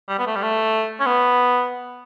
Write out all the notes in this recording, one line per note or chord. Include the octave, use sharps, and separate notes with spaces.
G3
B3
A3
G3
A3
C#4
B3